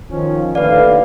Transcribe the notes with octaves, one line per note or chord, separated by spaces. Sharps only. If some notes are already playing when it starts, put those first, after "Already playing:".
D#3 F3 C#4
D#2 A2 D3 B4 D5 F5